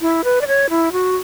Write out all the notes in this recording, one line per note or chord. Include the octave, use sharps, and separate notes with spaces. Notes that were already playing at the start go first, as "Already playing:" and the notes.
E4
B4
D5
C#5
E4
F#4